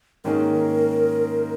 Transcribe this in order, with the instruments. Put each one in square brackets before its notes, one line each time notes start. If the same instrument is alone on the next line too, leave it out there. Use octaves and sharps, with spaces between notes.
[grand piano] G#2 D#3 A#3 C#4 G#4 [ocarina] A#4